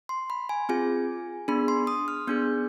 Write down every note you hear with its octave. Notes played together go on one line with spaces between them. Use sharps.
C6
B5
G#5
C4 F4 G#4 G#5
B3 D4 G#4 B5
C6
D#6
F6
B3 D4 G#4 G6